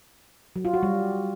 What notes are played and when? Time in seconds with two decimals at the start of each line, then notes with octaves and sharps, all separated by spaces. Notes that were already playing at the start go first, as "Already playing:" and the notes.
0.56 F#3
0.65 F4
0.74 F#4
0.83 G3